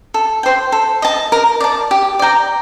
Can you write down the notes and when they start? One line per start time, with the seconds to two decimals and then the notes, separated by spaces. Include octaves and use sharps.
0.14 A4
0.43 C5 G5
0.72 A4
1.02 D#5 A5
1.32 A#4
1.61 D5 A5
1.91 G4
2.19 D5 G5 A#5